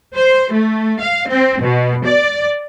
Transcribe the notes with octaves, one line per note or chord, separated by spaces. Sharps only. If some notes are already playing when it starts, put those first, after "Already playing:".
C5
A3
F5
C4
B2
D5